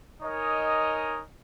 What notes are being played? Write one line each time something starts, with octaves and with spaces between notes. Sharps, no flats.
D#4 A#4 C#5 D#5 G#5